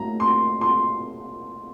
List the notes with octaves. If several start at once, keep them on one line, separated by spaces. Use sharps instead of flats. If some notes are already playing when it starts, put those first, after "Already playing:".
Already playing: A2 F#3 A#3 A#5
C6
C6